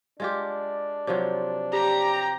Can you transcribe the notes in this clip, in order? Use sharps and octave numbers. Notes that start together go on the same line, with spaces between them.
G#3 D4 F4 G4
C3 F3 F#3
G4 A#5